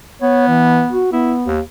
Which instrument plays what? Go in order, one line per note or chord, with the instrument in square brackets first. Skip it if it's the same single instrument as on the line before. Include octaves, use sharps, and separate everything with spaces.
[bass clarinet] B3 [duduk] C#5
[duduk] E3
F#4
[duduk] B3 [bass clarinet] E4
[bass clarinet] D#2